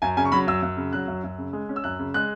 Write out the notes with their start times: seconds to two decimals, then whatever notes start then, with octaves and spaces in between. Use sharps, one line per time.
0.02 F#2 G#5
0.17 C#3 G#5
0.25 C#6
0.32 F#3 B5
0.47 F#2 E6
0.63 F#2
0.77 C#3
0.93 F#3 F#6
1.07 F#2
1.24 F#2
1.38 C#3
1.53 G#3
1.69 C#4
1.76 E6
1.84 F#2 F#6
1.99 C#3
2.14 G#3 F#6